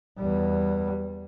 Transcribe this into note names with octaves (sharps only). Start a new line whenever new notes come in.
E2 G3